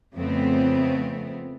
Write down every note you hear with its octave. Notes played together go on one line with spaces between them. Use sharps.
F2 C#3 F3 A3 B3 C4